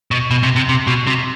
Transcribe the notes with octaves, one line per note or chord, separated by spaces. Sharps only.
B2
B2
C3
C3
C3
B2
C3